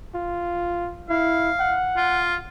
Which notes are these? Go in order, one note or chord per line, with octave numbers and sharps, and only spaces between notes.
F4
E4 F5
F#5
F4